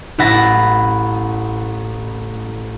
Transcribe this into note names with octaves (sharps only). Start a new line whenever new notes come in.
A1 E4 F#5 B5 A6 A#6